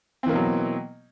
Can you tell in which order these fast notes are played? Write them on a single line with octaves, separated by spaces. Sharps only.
C4 E3 A#3 B2 F#3